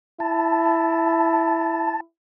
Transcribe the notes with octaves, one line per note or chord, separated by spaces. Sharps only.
E4 A5